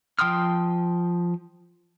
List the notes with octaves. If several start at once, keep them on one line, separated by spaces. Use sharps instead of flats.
F3 G5 C6 D#6 F6